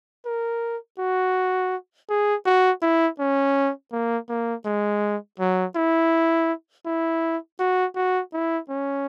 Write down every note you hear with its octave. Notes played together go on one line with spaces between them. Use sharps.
A#4
F#4
G#4
F#4
E4
C#4
A#3
A#3
G#3
F#3
E4
E4
F#4
F#4
E4
C#4